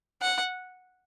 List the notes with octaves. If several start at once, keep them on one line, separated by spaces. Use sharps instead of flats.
F#5